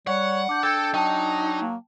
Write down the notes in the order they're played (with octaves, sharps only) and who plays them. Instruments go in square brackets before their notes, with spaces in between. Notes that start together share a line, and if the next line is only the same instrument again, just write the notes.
[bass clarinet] G3 [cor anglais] C#5 [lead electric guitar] F#5
[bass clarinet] D4 [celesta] D6 G6
[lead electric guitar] A4 [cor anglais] G5 [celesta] E6 G6 G#6
[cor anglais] F#3 [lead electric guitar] D#4 [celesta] G5 A5
[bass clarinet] A#3